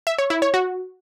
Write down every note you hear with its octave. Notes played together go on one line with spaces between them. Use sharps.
E5
C#5
E4
C#5
F#4